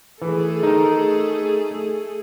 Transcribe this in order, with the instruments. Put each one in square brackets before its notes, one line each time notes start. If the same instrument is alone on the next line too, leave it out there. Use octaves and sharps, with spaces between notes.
[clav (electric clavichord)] E3 [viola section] A3 G#4 A4
[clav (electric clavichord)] D#4 A#4